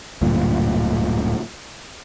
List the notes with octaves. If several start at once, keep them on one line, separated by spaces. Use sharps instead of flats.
D1 D2 G2 A#2